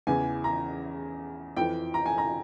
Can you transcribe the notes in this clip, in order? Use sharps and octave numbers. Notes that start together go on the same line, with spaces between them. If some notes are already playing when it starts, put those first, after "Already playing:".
E2 C#3 E3 G#5
A#5
F2 E3 G5
A#5
G#5
A#5